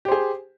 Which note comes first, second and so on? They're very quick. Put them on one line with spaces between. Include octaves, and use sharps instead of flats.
G4 C5 G#4